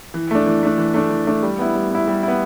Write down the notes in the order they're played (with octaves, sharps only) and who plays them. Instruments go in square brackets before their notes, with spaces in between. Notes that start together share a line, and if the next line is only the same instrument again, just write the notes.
[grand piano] E3
A3 D4
E3
A3 D4
E3
A3 D4
E3
A3 D4
G3
B3 E4
G3
B3 E4
G3
B3 E4